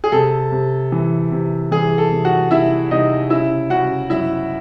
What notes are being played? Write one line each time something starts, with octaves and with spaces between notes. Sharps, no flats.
G#4
C3 A4
C3
E3
C3
E3 G#4
A4
C3
F#4 F#5
C3 E4 E5
C3 D#4 D#5
C#3 E4 E5
C#3 F#4 F#5
F#2 E4 E5